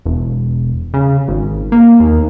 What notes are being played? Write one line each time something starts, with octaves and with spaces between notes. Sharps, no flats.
E1
C#3
G#1
A#3
D#2